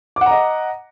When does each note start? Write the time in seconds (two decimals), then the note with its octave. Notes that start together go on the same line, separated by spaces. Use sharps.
0.16 D6
0.21 F#5
0.26 A#5
0.31 D#5